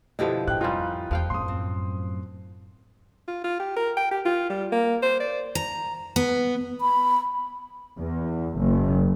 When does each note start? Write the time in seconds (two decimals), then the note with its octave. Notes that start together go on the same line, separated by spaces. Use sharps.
0.19 B2 D3 F3 E4 G4 D#5
0.48 A2 G5 F#6
0.61 F2 G3 C#4 D#4 F4 C6
1.11 E2 F3 F5 G5
1.30 F#2 A2 C6 D#6
1.48 C4
3.28 F4
3.44 F4
3.60 G4
3.76 A#4
3.97 G5
4.11 G4
4.25 F4
4.50 G3
4.72 A#3
5.03 C5
5.20 D5
5.55 A#5
6.16 B3
6.81 B5
7.97 E2
8.58 F#1